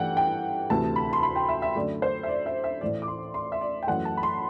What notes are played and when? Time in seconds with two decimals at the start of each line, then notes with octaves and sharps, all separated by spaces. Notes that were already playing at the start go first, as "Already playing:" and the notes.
Already playing: G2 E3 A3 F#5 G5
0.17 G5
0.70 D2 C3 E3 A3 A5
0.96 B5
1.13 C6
1.23 B5
1.36 G5
1.49 E5
1.62 E5
1.76 F#2 D3 A3 D5
2.02 C5
2.23 E5
2.28 D5
2.46 E5
2.64 E5
2.81 A2 E3 A3 D5
3.02 D6
3.08 C6
3.34 C6
3.52 E5
3.61 D5
3.83 G5
3.87 F#2 E3 A3 F#5
4.05 A5
4.17 B5
4.23 C6